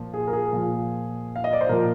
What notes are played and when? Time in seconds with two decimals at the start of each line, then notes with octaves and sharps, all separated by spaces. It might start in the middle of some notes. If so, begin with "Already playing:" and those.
Already playing: A#2 F3
0.14 G#4
0.27 A#4
0.33 G#4
0.53 A#2 F3
1.36 F5
1.44 D#5
1.53 D5
1.61 C5
1.69 A#2 F3 A#4